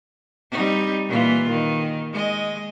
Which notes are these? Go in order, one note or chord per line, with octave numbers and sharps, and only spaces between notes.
G3 C4 D#4
A#2 E3 F4
D#3
G#3 D#5